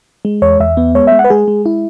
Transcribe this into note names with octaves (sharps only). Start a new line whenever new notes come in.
G#3
E2 C#5
E2 E5
B3
G#3 C#5
G#3 E5
F#5
B4
G#3 G#4
G#3
E4